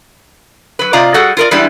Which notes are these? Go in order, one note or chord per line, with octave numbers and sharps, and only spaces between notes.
F#3 B4
C3 F4 D5 D#5 A#5
G3 F#4 G#4 A4 F#5
F4 A#4 D5
E3 G3 G#3 B3 D4 E4